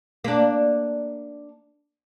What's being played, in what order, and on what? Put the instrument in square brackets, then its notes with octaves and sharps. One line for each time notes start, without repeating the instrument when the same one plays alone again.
[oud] A#3 D4